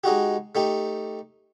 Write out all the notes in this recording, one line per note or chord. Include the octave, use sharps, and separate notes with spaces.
G#3 D#4 F#4 G4
A3 D#4 G4